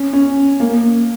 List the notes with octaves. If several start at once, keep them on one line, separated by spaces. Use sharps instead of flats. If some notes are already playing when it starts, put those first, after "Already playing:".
Already playing: C#4
C#4
A#3